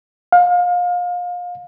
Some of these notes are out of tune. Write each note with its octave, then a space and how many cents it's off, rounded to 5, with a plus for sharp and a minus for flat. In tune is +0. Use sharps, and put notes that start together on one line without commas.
F5 +30